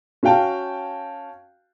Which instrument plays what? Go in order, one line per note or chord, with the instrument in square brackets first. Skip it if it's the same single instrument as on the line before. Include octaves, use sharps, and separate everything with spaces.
[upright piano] C#4 F#4 F5 G5 A5